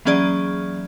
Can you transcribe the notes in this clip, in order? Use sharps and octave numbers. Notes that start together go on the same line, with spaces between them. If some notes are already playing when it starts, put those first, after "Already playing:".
E3 F#3 A#3 C#4 G#4 D5